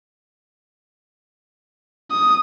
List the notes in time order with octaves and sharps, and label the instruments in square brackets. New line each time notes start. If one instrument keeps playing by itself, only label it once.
[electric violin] D#6